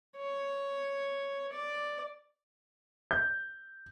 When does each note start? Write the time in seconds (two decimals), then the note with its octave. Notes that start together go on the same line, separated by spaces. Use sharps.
0.17 C#5
1.52 D5
3.11 G6